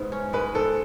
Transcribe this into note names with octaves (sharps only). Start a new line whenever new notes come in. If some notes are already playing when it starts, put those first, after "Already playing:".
Already playing: G#2 B3 E4
C#4
G#3 B4
G#2 A4